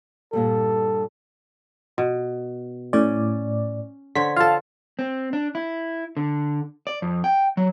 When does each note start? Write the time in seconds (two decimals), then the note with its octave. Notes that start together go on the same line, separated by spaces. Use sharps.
0.33 G2 A#2 G3 A4
1.98 B2
2.93 A2 C#4 D5
4.15 D3 C5 C#5 B6
4.36 F4 A4 F5 A5
4.99 C4
5.33 D4
5.55 E4
6.17 D3
6.87 D5
7.02 F2
7.24 G5
7.57 F#3